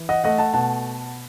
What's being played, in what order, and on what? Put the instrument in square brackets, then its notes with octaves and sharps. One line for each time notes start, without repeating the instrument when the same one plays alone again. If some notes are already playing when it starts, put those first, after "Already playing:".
Already playing: [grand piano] E3
D#5 F#5
A3 D#5 F#5
F#5 A5
B2 F#5 A5